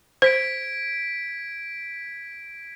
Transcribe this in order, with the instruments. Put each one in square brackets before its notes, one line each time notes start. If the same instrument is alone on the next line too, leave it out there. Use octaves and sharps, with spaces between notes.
[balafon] C5 [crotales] G#6 B6 D7